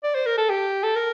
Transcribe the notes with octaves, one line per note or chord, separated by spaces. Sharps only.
D5
C5
A#4
A4
G4
A4
A#4